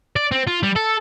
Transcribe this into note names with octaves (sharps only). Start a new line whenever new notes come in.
D5
C4
F4
G3
A4